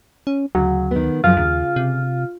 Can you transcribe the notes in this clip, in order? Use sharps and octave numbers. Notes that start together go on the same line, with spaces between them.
C#4
D2 C#3 F#3
D#3 B3
F#2 C#3 F3 F4
D#2 C#3
C3